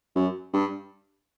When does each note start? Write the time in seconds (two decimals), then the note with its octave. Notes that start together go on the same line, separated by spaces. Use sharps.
0.15 F#2
0.53 G2